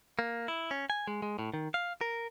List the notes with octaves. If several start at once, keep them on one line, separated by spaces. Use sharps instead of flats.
A#3
E4
C#4
G#5
G#3
G#3
A2
D#3
F5
A#4